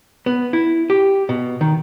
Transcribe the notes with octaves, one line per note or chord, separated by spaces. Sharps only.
B3
E4
G4
B2
D#3